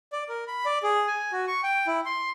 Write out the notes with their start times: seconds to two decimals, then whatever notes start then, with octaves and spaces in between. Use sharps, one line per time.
0.13 D5
0.29 A#4
0.48 B5
0.65 D5
0.83 G#4
1.07 G#5
1.32 F#4
1.47 C#6
1.63 G5
1.87 E4
2.06 C6